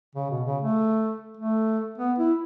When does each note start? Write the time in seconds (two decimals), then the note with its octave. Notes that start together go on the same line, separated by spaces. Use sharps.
0.15 C#3
0.31 B2
0.46 C#3
0.62 A3
1.37 A3
1.98 B3
2.19 E4